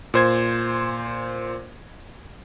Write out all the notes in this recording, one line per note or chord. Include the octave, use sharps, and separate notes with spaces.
A#2 C5 G#6